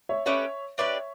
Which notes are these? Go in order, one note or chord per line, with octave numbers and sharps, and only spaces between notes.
C#5 E5
A3 C#4 G4 B4 C#5 E5
D4 G4 B4 C#5 D5 E5